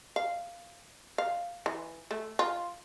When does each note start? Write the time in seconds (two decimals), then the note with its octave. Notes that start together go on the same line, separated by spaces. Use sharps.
0.16 F5
1.18 F5
1.66 E3
2.11 A3
2.39 F4